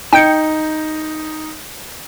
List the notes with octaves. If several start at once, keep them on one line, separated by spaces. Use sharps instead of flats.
D#4 G5 G6 C#7